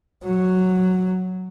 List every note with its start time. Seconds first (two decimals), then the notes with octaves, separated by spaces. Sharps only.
0.24 F#3